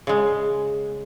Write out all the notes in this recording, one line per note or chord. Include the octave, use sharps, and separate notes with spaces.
C#3 G#3